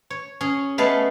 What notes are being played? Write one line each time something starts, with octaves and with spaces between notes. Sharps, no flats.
C#5
C#4 G#4
G#3 A3 B3 F5 A5